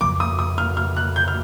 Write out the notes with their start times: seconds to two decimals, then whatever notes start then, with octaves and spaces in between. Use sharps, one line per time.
0.01 F2 C#3 F3 A3 D6
0.20 D#6
0.39 D#6
0.58 F6
0.77 F6
0.96 F#6
1.16 G6
1.28 F6